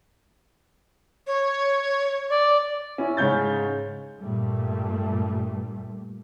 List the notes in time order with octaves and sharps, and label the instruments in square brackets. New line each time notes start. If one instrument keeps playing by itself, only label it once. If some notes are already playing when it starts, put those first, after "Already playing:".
[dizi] C#5
[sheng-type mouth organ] D5
[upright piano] C#4 E4
G#2 C#3 C#5 G6 A6
[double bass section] G2 A#2 G3 A3